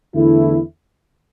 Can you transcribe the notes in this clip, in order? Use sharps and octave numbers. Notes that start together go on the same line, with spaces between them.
E2 D3 A3 E4